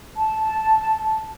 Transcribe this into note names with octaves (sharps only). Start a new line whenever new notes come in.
A5